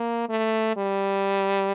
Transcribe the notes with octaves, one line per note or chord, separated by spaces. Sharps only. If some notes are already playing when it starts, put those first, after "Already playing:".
Already playing: A#3
A3
G3